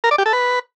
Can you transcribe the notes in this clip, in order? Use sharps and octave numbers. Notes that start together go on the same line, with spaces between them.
A#4
D5
G4
A4
B4